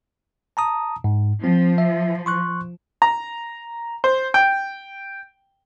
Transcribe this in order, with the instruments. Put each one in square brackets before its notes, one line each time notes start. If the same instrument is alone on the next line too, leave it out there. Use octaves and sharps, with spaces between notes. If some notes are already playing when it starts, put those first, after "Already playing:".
[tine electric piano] A5 A#5 D#6
G#2
[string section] F3 [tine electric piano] C4
[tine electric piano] E5
C6 C#6 F#6
[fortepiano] A#5
C5
G5